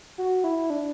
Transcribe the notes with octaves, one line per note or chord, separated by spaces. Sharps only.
F#4
E4
D4